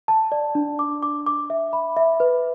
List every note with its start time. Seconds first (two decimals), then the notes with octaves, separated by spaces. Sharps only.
0.08 A5
0.32 D5
0.55 D4
0.79 D6
1.03 D6
1.27 D6
1.50 E5
1.73 B5
1.97 E5
2.20 B4